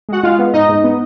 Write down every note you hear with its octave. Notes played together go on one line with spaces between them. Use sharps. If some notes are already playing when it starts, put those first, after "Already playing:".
G#3 F#4 F#5
G#3 F4 F5
B3
G#2 D#4 D#5
G#2
B3